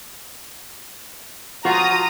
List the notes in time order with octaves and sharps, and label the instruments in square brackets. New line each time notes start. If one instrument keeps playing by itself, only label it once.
[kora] F3 F4 [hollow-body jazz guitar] F#4 [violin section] A#5 D#6